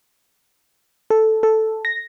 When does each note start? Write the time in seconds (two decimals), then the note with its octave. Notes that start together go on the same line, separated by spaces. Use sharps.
1.10 A4
1.43 A4
1.85 A#6